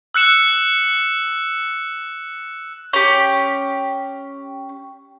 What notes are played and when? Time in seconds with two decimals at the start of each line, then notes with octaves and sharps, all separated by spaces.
0.14 E6 F#6 C#7 E7
2.93 C#4 G4